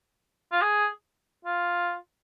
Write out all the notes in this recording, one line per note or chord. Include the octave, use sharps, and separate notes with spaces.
F4
G#4
F4